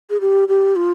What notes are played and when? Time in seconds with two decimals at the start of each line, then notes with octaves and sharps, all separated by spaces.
0.10 G#4
0.21 G4
0.49 G4
0.76 F4